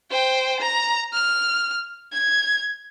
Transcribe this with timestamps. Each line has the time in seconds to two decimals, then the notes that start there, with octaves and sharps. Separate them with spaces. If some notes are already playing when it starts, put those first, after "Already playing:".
0.11 C5 G5
0.60 A#5
1.13 F6
2.12 G#6